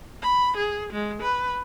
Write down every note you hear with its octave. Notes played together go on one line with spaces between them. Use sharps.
B5
G#4
G#3
B4